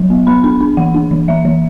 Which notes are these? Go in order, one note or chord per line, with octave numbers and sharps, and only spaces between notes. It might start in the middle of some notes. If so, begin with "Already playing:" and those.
Already playing: F#3
B3
B3 B5
D4 B5
D4
E3 F#5
D4
E3
E3 E5
E3